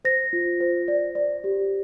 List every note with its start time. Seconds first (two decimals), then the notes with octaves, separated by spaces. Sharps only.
0.05 C5 A#6
0.33 F4
0.60 C5
0.88 D5
1.15 D5
1.44 G4